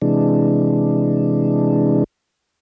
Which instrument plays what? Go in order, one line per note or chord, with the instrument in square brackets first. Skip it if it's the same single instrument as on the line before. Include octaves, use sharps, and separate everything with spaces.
[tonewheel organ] C3 E3 G#3 D4